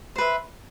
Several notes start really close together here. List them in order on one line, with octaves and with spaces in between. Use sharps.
C5 B4 E5